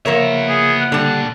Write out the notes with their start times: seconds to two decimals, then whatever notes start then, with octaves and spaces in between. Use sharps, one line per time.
0.06 C#3 F3 A#3 B3 A#4 C#5 E5
0.49 G#4
0.81 F#5
0.92 A#2 D3 G3 A5